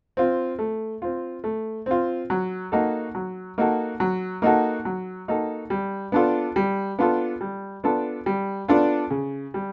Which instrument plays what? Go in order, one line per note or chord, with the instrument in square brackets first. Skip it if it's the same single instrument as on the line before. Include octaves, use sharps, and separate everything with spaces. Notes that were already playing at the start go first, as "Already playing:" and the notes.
[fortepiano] C4 F4
A3
C4 F4
A3
C4 F4
F#3
A#3 D#4 F#4 A4
F#3
A#3 D#4 F#4 A4
F#3
A#3 D#4 F#4 A4
F#3
A#3 D#4 F#4 A4
G3
B3 D4 F4 A4
G3
B3 D4 F4 A4
G3
B3 D4 F4 A4
G3
B3 D4 F4 A4
C#3
G3